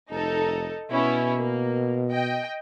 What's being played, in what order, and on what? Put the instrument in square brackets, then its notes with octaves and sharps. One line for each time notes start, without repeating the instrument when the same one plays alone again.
[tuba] F1 [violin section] D#4 A4
[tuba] B2 [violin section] B3 C#4 E4
[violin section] A#3
D#5 G5